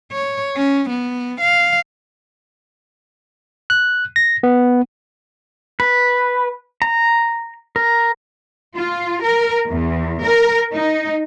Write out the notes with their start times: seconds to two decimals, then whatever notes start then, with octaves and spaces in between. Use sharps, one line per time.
0.11 C#5
0.56 C#4
0.89 B3
1.41 F5
3.70 F#6
4.16 A#6
4.43 B3
5.80 B4
6.82 A#5
7.76 A#4
8.76 F4
9.21 A#4
9.69 E2
10.24 A#4
10.74 D#4